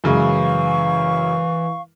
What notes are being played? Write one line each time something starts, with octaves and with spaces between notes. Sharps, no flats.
F#2 C#3 E3 G#3 F5 C#6